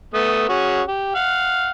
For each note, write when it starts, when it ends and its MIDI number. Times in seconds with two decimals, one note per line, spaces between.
0.14 0.44 57
0.14 0.44 59
0.14 0.44 87
0.49 0.82 61
0.49 0.82 66
0.49 0.82 68
0.88 1.15 67
1.15 1.71 77
1.15 1.71 78